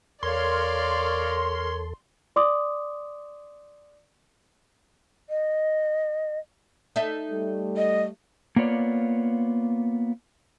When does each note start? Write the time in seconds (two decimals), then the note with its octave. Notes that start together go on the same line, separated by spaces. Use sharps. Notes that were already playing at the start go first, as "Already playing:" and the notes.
0.23 E2 A4 A#4 C#5 D5 F5 C6
2.36 D5 C6 D6 D#6
5.30 D#5
6.96 D#4 A4 E5
7.30 G3 A3
7.77 D#5
8.56 A#3 B3 F4 C#5 D5